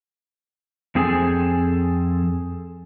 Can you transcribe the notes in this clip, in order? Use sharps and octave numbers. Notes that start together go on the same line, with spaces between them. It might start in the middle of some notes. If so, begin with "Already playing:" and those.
F2 C4 G#4 A4 G#5